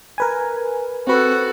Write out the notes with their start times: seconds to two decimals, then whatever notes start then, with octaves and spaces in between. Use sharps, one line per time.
0.18 A#4 B4 G#5
1.07 C4 F#4 A4 B4